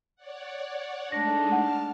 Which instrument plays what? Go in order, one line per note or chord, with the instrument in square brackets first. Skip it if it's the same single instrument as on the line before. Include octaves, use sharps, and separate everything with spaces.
[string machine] C#5 D5 F#5
[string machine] G#3 A3 D#4 [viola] D4 [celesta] A#6
[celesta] F#5 [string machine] A5 F6